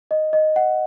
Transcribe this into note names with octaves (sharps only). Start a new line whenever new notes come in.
D#5
D#5
F#5